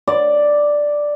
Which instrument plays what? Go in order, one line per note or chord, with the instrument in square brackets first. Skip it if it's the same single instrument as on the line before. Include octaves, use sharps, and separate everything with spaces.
[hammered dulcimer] D5